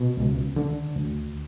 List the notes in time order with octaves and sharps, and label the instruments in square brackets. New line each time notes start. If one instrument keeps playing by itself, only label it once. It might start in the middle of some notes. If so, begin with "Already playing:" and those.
Already playing: [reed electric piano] B2
C#2
D3
D2